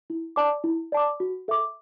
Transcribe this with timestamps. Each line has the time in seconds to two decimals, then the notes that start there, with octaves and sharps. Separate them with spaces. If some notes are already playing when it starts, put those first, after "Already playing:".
0.10 E4
0.36 D5 A5 D6
0.64 E4
0.92 D5 A5 D6
1.20 F#4
1.48 A4 E5 D6